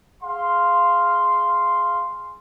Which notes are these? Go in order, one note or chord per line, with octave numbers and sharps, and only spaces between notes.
G#4 F5 C6